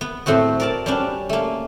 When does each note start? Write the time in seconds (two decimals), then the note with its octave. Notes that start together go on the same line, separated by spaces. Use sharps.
0.01 B3
0.26 A2 A3 C4 F#4
0.60 A#4 D5 A5
0.86 G3 C#4 D4
1.29 A3 A#3